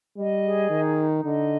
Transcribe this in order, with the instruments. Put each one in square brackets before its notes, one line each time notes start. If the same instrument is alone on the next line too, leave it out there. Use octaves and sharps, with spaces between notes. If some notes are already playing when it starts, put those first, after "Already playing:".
[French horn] G3 [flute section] D#5
[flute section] G#4
[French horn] D#3 [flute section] D#4
[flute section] D#4
[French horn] D3 [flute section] D#5